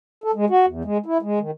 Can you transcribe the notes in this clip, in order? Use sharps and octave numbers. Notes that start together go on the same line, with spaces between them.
A4
G#3
F#4
E2
G#3
E4
G#3
D#3